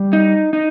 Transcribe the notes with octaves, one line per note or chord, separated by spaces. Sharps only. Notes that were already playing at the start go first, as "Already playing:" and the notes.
Already playing: G3
D#4
D#4